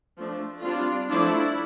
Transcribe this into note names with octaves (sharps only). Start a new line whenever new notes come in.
F3 A3 D4
G3 C4 D4 F4
F3 A3 D4 E4